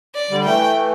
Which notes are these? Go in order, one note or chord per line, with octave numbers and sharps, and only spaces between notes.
D5
D3 G3
E3 A3 G5